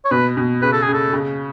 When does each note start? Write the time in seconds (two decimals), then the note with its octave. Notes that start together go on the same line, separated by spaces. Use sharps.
0.05 C#5
0.11 B2 B4
0.37 B2
0.62 C#3 B4
0.72 A4
0.83 G#4
0.88 C#3
0.93 A4
1.13 C#3